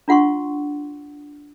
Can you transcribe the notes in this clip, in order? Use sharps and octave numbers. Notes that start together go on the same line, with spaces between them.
D4 F4 F#5 C6 C#6